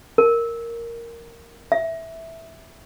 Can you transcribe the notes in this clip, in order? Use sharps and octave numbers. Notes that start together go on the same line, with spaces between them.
A#4
E5